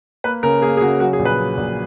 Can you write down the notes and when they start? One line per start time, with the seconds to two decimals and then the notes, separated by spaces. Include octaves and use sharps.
0.24 A#3 B4
0.43 C#3 A#4
0.62 A#3 G#4
0.77 G#4
0.81 C#3 F#4
1.00 F#3 F#4
1.13 G#4
1.19 A#1
1.25 B4
1.39 F#3
1.57 A#1